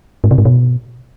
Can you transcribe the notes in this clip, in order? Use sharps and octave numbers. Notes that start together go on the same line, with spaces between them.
G#2
C3
G#2
B2